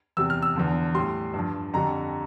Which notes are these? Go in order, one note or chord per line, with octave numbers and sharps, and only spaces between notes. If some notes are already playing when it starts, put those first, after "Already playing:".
E2 C3 G3 E6
F6
E6
E2 D3 F3
A2 G3 C6
G2
F3
F2 D3 G3 A#5